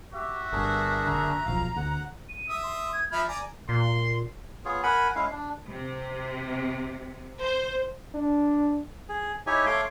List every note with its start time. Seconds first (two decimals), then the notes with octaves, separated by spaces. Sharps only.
0.14 F#4 G4 E5
0.52 G1 G2 D4 G#4 A#4
1.07 F#1 B1 D3 A#5
1.46 D1 B1 F3 F5
1.76 D2 F#5
2.29 D#7
2.49 E5 D#6
2.64 C6
2.93 G#6
3.12 F3 E5 B5 F6
3.28 D5 G#5 A#5
3.69 A#2 C6
4.65 B3 F4 G#4 C#5
4.83 A#4 F#5 G#5 B5
5.15 G#3 C#4 E4 F5
5.31 D4
5.69 C3
7.42 C5
8.14 D4
9.09 G#4
9.47 D#4 E4 G4 C#5 G#5
9.66 A3 C#5 F5 C6 D6